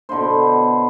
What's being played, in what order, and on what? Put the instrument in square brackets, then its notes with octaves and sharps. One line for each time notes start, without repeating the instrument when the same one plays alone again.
[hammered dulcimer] B2 D3 E4 C5